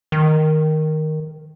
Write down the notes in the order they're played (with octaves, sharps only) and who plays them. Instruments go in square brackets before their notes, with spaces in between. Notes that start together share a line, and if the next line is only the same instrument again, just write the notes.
[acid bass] D#3